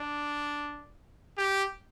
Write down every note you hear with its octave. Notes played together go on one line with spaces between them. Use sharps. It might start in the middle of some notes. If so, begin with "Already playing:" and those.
Already playing: D4
G4